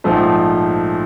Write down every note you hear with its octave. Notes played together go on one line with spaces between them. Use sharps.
A#1 G#2 F3 A3